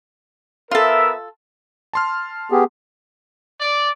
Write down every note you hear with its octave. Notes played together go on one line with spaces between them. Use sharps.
B3 F4 A4 A#4 E5
A5 C6 F6
B3 G4 G#4
D5